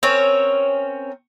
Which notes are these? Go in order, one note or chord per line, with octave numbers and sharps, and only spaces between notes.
C4 C#4 A#4 C#5